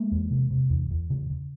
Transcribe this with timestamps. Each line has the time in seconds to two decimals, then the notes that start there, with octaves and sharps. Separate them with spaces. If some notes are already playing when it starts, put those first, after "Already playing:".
Already playing: G#3 A#3
0.11 E2
0.31 C3
0.50 C3
0.70 E2
0.91 E2
1.10 C#3
1.30 C#3